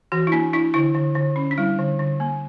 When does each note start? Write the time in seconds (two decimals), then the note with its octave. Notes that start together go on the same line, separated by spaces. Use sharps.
0.12 E3 F#4
0.27 E4
0.32 A#3 D4
0.53 D4 E4
0.74 D3 E4
0.95 D3
1.15 D3
1.36 C#4
1.51 D4
1.58 G3 E4
1.79 D3
1.99 D3
2.20 A#3